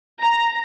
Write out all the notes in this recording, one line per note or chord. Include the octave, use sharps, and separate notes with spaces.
A#5